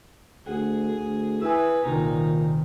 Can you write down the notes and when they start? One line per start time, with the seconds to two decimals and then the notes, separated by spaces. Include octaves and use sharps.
0.46 D2 G#4 F#5
0.98 D2
1.41 E4 B4 G#5 D#6 E6
1.85 C2 A#2 D#3 D#4